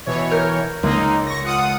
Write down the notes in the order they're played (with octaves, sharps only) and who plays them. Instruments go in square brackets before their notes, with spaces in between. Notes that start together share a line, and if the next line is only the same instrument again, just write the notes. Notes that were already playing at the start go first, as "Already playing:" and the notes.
[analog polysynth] B2 E3 C#5
[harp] A#4 F6 G6
[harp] C#2 G#3 [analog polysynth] A#3 D#4
[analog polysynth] C#6 A#6
F4 F#5 D#6